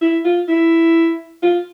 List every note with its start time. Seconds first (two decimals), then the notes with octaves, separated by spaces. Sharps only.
0.01 E4
0.25 F4
0.48 E4
1.42 F4